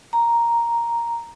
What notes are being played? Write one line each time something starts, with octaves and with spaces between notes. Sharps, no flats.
A#5